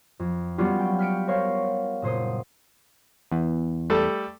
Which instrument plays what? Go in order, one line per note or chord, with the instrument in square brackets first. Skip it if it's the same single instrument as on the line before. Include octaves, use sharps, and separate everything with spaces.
[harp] F2
F#3 G3 B3 C#4 F4 G4
G5
F6 G6 B6 C#7 D7
A#4 C5 C#5 F5
F#1 A#2 C5 D#6
[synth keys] E2
[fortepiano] G3 A3 A4